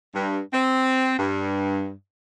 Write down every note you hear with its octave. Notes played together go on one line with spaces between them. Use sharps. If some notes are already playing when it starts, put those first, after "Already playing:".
G2
C4
G2